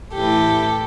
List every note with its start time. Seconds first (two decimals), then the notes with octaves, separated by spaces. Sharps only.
0.15 A2 E3 G4 A4